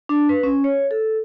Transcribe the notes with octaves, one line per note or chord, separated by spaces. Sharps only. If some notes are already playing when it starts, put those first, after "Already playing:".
D4
B4
C#4
C#5
A4